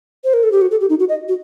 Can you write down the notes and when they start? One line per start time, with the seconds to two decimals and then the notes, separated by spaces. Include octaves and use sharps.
0.24 C5
0.34 A#4
0.43 A4
0.52 G4
0.61 F#4
0.71 A4
0.81 G4
0.90 D#4
1.00 F#4
1.09 D#5
1.28 F#4